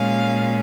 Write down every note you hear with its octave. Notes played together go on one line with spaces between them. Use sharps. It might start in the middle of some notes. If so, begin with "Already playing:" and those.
Already playing: A#2 G#3 C#4 F5